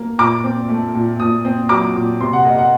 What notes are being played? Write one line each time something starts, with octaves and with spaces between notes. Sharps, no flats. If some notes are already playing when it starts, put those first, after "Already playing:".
Already playing: A#3
A#2 D6
C4
A3
A#2
A#2 D#6
C4
F#3 D6
A#2
C3 C6
F#5
A#3 D#5
F#5